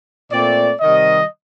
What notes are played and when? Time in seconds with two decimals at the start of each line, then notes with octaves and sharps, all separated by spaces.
0.31 A#2 A3 C4 D5
0.80 C3 D#3 G3 D#5